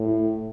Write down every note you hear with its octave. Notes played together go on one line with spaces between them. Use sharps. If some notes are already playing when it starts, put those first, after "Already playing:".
Already playing: A2